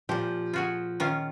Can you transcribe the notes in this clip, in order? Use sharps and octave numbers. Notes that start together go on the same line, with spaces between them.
A#2 F3 G4
F4 F#4 G#4
D#3 C#4 F4